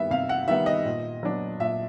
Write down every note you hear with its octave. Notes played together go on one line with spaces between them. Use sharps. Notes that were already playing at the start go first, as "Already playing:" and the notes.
Already playing: D#3 G3 B3 E5
C3 F5
F#5
D#3 G3 B3 E5
D#5
A#2
F#3 B3 D4
A#2 E5